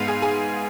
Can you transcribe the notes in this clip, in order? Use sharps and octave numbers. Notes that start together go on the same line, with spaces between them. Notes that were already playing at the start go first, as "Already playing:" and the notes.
Already playing: G#2 G#3 B3 F5
G#4 G#5
G#4 G#5